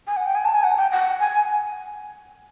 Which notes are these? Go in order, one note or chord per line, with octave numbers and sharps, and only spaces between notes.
G#5
F#5
G5
G#5
A5
G#5
F#5
G5
F#5
G#5